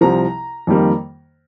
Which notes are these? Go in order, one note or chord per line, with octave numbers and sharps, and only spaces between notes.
C2 C3 F3 A#5
F2 D#3 G3 A#3